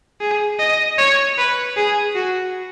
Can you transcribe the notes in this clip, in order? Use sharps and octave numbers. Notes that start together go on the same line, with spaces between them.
G#4
D#5
C#5
B4
G#4
F#4